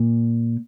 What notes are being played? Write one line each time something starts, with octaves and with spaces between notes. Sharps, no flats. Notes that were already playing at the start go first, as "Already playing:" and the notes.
Already playing: A#2